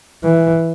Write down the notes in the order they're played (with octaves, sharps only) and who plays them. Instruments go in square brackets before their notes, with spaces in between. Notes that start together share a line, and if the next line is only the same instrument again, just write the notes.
[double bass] E3